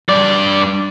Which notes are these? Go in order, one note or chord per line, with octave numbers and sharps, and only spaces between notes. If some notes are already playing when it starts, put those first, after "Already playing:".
G2 D5